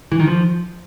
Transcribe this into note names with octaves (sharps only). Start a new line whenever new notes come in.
E3
D#3
F3